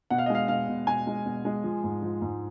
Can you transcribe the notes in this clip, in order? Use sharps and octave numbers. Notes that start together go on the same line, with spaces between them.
B2 F#5
F5
D#5
G#3 F5
B2 F5
B2
B2 G#5
G#3
B2
G#3
F3
G#2
F3
G#2